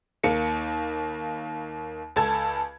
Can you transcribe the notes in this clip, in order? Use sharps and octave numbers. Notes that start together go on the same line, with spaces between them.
D#2 A#3 C#7
C#2 A4 A5 G#6